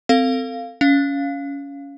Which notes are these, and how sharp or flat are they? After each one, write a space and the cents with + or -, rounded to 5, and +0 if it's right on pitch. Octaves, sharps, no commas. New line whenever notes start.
C4 -20 A4 +25 F5 +0
C#4 +20 F5 +0